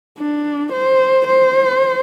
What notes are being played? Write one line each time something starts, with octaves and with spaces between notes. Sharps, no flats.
D4
C5
C5